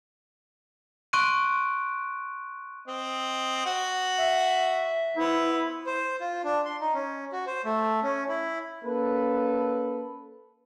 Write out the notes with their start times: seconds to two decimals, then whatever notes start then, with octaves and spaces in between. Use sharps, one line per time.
1.13 C6 C#6 F#6 D7 D#7
2.88 C4 D#5
3.65 F#4 F#5
4.17 E5
5.17 B3 E4 C5
5.87 C5
6.20 F4
6.44 D4
6.65 C6
6.81 D#4
6.94 C#4
7.32 F#4
7.47 C5
7.65 A3
8.03 C#4
8.28 E4
8.84 A#3 C#4 A4 B4